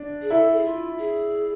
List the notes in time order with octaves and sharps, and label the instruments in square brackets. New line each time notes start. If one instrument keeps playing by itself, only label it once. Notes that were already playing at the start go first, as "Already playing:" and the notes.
Already playing: [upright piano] D4
[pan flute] G#4
[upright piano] E4 [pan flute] A4
[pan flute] A4
G#4
F4
G#4